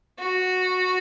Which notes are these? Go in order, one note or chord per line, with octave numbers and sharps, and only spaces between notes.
F#4